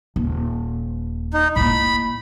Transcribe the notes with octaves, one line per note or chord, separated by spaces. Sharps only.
D#1
D#4
A2 A#3 B5